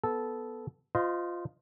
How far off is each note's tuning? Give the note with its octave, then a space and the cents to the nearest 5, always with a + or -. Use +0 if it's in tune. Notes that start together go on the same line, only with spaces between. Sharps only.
B3 +0 A4 -10
F4 +0 C5 -30 D#5 +0